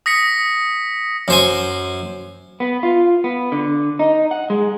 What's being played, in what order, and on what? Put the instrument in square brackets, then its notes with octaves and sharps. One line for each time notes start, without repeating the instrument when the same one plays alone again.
[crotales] D#6 A#6 B6 C#7
[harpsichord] F#2 C5 G#5
[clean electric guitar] B3
F4
B3
D3
D#4
F#5
G#3